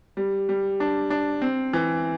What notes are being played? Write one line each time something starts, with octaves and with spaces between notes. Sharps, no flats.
G3
G3
D4
D4
C4
E3